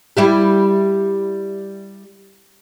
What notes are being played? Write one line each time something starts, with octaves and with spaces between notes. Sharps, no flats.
G3 E4 G4